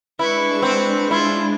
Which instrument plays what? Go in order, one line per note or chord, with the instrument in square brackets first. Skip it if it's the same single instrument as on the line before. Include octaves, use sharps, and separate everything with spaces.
[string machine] G#3 D4 [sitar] E4 [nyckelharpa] B4 C#6
[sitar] C4
[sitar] E4 [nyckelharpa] F4